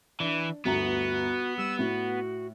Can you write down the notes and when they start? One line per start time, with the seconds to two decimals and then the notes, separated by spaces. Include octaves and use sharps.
0.20 E3 D4
0.65 G1 D2 B3 F#4 A#5
1.58 G3 E6
1.79 A2 F#4